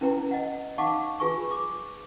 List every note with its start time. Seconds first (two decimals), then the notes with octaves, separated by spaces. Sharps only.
0.01 C#4 E4 B4 G5 A#5
0.31 D#5 F#5
0.78 D#4 F5 F#5 A5 C#6 D6
1.20 F4 G#4 B4 G#5 C#6
1.51 D6